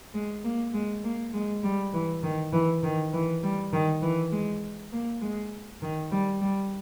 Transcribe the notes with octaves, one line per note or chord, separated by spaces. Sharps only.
G#3
A#3
G#3
A#3
G#3
G3
E3
D#3
E3
D#3
E3
G3
D#3
E3
G#3
A#3
G#3
D#3
G3
G3